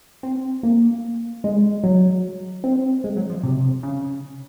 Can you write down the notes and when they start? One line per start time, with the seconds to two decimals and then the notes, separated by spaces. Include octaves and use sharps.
0.23 C4
0.63 A#3
1.44 G#3
1.84 F#3
2.64 C4
3.04 G#3
3.17 F#3
3.30 F3
3.43 C3
3.83 C#3